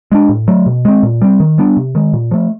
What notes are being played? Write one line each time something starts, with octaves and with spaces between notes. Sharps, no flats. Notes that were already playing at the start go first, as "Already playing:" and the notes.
G#3 B3 D4
A2
F#3 A3
B2
G#3 C4
A#2
G3 C4
D#3
G3 B3 D4
C3
D#3 G#3
A#2
F3 A3